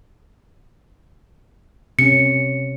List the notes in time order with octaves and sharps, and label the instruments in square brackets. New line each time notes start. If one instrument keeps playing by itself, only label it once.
[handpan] C3 C#4 [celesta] C#7